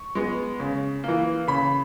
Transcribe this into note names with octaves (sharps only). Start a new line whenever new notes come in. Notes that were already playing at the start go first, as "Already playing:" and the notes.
Already playing: C#6
G#3 B3
C#3
E3 A#3
C#3 B5